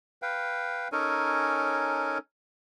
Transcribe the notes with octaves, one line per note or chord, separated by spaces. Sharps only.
B4 F5 G5
C#4 D#4 A4 A#4 C#5 G#5